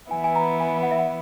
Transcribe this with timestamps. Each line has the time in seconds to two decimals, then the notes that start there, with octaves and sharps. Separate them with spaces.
0.11 E3 B3 E4 G#5
0.24 G#5
0.35 A#5
0.60 G#5
0.83 F#5
0.91 E5
0.99 F#5